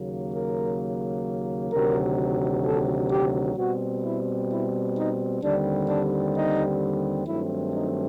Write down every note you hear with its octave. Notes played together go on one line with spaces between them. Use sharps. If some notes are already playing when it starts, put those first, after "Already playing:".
Already playing: D#2 C#3 F#3 A#3
A#4
D2 C3 D#3 F#3 A#4
A4
G4
B2 G3 C4 F#4
E4
E4
D#4
D#2 D3 G3 C4 D4
D4
D#4
G2 D#3 F#3 A3 C4 E4
D#4